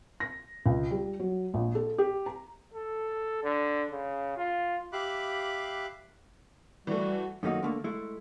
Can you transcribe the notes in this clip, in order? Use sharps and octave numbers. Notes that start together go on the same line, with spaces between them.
A#6
C#2
G3
F#3
A#1
A4
G4
A#5
A4
D3
C#3
F4
G4 E5 F5 B5 D6 F#6
E3 G3 A3 F#4
F#2 D#3 A3 A#3 D#4 F#4
D3 A3 A#3
G#3 A3 E4